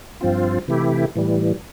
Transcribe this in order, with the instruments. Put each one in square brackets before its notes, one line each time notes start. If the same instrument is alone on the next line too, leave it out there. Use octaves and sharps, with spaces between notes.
[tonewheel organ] G2 F3 C4 F4
C3 E3 A3 E4 G4
A2 E3 G3